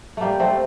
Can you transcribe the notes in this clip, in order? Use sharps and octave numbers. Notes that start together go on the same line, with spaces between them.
G3 A3 A#3
A3 C4